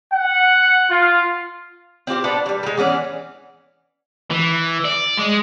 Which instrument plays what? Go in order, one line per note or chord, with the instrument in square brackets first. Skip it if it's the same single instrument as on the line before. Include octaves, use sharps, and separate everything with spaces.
[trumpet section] F#5
F4
[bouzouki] C4 F4 G4 C5
B3 D4 A4 D5
F#3 G3
G3 G#3
E3 B3 C#4 D5
[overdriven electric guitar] E3
D5
G#3